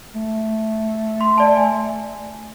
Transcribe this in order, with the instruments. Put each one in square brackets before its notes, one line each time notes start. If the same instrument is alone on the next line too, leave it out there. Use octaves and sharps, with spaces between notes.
[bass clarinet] A3
[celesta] C6
D5 A5
G#5